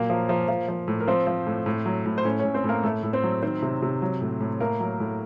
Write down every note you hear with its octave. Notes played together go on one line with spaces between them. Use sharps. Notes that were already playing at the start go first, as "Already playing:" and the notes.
Already playing: A#2 F#3 A#3 A#4
F3
F3
F3
F3
A2
A#4
F3 C4 C5
F3
A2
A2
F#3
A2
C5
A2 C#4 C#5
A2 C#4 C#5
C4 C5
A2
A#3 A#4
A2 A3 A4
A2
C4 C5
F#3
D#3 C4 C5
C3
C3
F#3
A2
A2
A2 A#3 A#4
F#3
A2